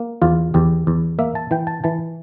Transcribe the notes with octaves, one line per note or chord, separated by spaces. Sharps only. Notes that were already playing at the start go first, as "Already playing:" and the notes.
Already playing: A#3
E2 F4
E2 G4
E2
A#3 E5
A5
E3 G5
A5
E3 A5